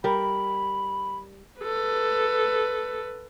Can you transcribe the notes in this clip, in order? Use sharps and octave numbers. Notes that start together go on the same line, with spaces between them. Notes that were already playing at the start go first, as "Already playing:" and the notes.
G3 A#4 B5
A4 B4